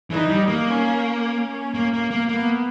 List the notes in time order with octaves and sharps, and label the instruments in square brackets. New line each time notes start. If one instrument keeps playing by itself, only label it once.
[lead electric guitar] E3 [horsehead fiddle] D#4
[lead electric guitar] G3
A#3
[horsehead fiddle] C#4
C#4
[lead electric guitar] A#3
A#3
A#3
[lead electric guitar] A#3 [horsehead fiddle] B3